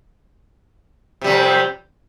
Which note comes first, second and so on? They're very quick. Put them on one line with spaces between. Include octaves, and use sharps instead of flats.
C3 G3 F2